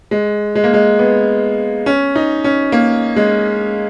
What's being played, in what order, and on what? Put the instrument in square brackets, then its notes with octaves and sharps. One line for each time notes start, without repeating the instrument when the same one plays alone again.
[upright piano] G#3
G#3
A#3
G#3
B3
C#4
D#4
C#4
A#3
G#3